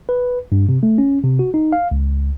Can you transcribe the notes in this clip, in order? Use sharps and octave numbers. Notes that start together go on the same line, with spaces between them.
B4
G2
C3
A3
C#4
C3
F#4
D#4
F5
C#2